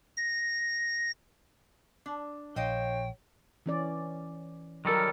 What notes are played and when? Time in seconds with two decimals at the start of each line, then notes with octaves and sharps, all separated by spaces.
0.17 A#6
2.06 D4
2.56 A#1 C5 C#5 D#5 F5 G5
3.66 E3 C#4 D5
4.85 D#3 F#3 G3 A4 A#4